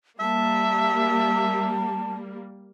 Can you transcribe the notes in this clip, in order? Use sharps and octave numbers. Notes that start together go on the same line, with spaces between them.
G3 A#3 E5 A5